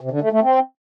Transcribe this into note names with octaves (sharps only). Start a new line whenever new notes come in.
C3
D3
A3
A3
C4